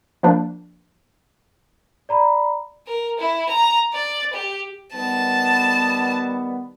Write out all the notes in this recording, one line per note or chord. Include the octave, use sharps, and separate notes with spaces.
F3 A#3 D4
D5 A#5 B5
A#4
E4
A#5
D5
G4
D#3 G3 B3 A5